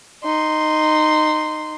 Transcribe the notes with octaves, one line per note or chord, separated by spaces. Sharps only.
D#4 C6